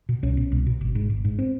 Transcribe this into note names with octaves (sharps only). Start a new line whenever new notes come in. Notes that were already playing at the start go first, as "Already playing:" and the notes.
B2
C2 C#4
B2
C2
B2
G#1
G#2
G#1
G#2
C4